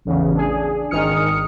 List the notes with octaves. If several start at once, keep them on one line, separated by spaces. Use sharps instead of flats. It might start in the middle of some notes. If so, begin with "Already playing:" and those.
A1 E2 C#3
D4 G#4
G#1 D#3 D#6 F6 C#7